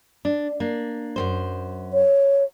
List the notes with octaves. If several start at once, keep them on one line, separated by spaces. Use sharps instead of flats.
D4
A#3 D4
F#2 B2 C5
C#5